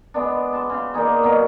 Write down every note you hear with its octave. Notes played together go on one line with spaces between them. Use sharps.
G#3 B3 D4
A5 C6
C#3 C6
A#3 D4 D#4 G#4
B2 F#3 A#4